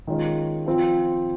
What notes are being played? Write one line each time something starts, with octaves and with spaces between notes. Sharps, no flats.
D#3 G#3 C#4 F4
F3 C4 F4